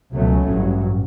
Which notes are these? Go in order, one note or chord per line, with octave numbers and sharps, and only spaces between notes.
C#2 B2 F#3 A3 C#4
A1 G2 F#3